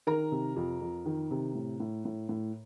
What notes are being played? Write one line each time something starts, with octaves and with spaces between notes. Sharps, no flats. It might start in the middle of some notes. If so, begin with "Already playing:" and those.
D#3 A#4 A#5
C3
F2
F2
D#3
C3
A2
A2
A2
A2